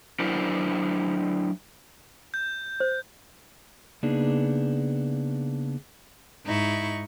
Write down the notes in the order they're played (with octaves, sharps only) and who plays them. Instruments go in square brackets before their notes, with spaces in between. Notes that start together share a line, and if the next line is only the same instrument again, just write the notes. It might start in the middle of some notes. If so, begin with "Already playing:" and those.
[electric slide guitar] F#3 D4 E4 A#4 C5
[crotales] G6
[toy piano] C5
[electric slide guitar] C#3 A#3 B3 D4 D#4 G#4
[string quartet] G#2 D#4 E4 C#6